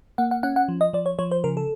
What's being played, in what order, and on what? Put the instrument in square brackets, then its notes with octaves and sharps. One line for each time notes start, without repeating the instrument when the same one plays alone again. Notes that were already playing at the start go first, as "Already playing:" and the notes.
[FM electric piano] A#3 F#5
F#5
C#4 F#5
F#5
F3
D#5
F3 D5
C#5
F3 C#5
C5
C#3 A#4
A4